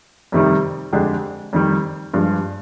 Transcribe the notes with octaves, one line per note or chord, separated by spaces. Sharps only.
F2 C3 D#3 G3
F2 D3 G#3 D4 G4
F2 D#3 G3
G2 F3 G#3